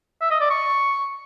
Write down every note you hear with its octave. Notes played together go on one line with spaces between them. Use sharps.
E5
D#5
D5
C#6